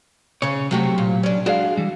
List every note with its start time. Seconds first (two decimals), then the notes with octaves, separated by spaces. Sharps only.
0.42 C#3 C#4 C#5
0.71 C3 F#3 A3 F#4 G4
0.98 A#2
1.23 C#4 D4
1.46 G#3 D4 F#4 F5
1.77 E3 G3